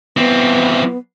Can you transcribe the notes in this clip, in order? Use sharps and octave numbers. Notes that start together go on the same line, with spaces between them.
E3 B3 C4